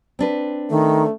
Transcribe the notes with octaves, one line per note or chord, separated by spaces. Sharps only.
C4 D4 B4
D#3 A3